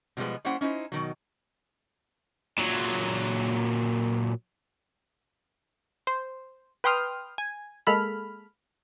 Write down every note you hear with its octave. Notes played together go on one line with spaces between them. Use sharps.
B2 F3 G3 G#3 B3
G3 A#3 C#4 E4 C5 F#5
C#4 D#4 E4 C5
B2 D#3 F#3
A#2 F#3
C5
B4 G5 C6 D#6 F6
G#5
G#3 A#3 A4 B5 F6